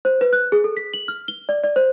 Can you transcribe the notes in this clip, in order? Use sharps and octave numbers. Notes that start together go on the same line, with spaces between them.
C5
B4
F#6
G#4
A4
B6
F#7
F6
G7
D5
D5
C5